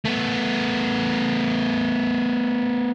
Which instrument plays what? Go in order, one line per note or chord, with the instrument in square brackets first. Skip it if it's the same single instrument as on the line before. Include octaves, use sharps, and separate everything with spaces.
[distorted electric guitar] A3 B3